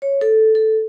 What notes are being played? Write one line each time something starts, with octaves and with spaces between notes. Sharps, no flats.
C#5
A4
A4